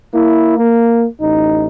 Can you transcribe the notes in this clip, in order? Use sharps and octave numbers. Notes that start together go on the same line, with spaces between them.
A#3 E4
A#3
A1 D#4